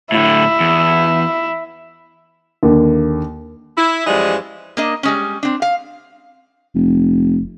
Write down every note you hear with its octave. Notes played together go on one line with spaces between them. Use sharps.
A2 D3 E4
E2
D#2 D3
E4
F#2 E3 F3 G3 G#3 D#5
A#3 D4 D#5
G3 G#3 C#4
C4 D4
F5
F1